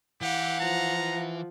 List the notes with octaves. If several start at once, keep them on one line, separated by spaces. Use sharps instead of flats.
E3 G4 F5 F#5
F3 A#5